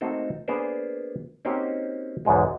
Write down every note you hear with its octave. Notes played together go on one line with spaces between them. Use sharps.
A3 A#3 C4 D#4 F#4 A4
A#3 B3 D4 G#4 A#4 C5
A#3 C4 C#4 D#4 F#4 G4
B1 E2 G#2 G#3